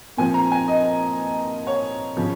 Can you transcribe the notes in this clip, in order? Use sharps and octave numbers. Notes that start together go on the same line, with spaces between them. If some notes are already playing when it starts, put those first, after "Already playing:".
A#2 F3 C4 G#5
A#5
G#5
D#5
C#5
C#3 F3